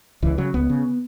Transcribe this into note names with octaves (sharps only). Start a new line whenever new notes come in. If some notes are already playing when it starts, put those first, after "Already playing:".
C#2 E3
C#3 F#3
C#2 B3
C#3